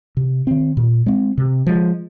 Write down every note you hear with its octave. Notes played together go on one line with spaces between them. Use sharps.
C3
D#3 C4
A#2
G#3 C4
C3
F3 G#3